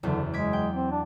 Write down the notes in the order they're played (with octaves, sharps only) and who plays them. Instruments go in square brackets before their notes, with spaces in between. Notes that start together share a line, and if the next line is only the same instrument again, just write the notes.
[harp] F#1 E2 [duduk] D3
[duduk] G#3 [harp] D6 G#6 B6
[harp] G5
[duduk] C4
D4